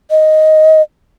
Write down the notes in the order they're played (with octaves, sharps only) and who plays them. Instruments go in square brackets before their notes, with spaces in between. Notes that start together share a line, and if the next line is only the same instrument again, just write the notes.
[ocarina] D#5